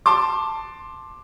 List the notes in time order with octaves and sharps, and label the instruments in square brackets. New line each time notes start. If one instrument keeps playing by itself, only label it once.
[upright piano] A5 C6 D6